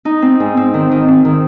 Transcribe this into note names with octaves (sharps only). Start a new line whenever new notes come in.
D#4
C4
G#2
C4
D#3
D#3
C4
D#3